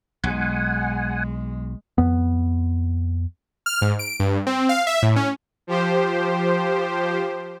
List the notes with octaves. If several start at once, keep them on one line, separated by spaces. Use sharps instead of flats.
B1 G#3 F#5 G#5
F2 B3
F6
G#2
D7
G2
C4
F5
E5
A2
C#4
F3 G4 C5